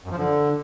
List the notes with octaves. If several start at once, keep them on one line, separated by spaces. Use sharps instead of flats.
F#2
F3
D3